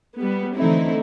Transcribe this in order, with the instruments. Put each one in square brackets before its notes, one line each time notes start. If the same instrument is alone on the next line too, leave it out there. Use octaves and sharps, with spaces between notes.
[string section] G3 B3
D3 E3 A3 C4 D#4 E4